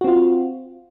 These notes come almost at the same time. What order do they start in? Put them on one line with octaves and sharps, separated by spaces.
F#4 C4 F4